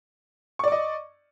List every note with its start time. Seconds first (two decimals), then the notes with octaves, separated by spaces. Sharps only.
0.59 C#6
0.64 D5
0.68 D6
0.72 D#5